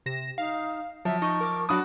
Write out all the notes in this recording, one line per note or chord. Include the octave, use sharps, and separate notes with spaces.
C3 A#6 E7
D#4 F5
F3 F#3 E5
D#4 D#5 C#6
A#4 D6
F#3 D4 F#4 B5 D6 D#6